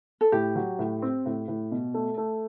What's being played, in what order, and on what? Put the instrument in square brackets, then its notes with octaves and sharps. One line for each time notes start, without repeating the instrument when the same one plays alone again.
[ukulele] A4
[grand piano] A2 [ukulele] G4
[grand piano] F#3
A2
C4
A2
A2
B2
A3
A3